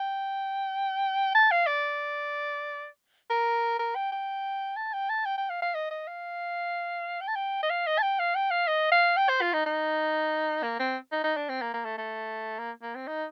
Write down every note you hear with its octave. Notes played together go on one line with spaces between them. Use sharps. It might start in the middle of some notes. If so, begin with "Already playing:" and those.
Already playing: G5
A5
F5
D5
A#4
A#4
G5
G5
A5
G5
A5
G5
G5
F5
F5
D#5
D#5
F5
G5
A5
G5
D#5
F5
D#5
A5
G5
F5
G5
F5
D#5
F5
G5
C5
F4
D#4
D#4
A#3
C4
D#4
D#4
D4
C4
A#3
A#3
A3
A3
A#3
A#3
C4
D#4